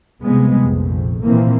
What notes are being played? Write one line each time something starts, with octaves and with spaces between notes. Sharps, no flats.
C3 F3 G3 G#3 B3
A#1 F2
A#2 E3 F3 A#3 C4